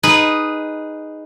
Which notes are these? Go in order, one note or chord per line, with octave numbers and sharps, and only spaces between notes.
D#4 G#4 B4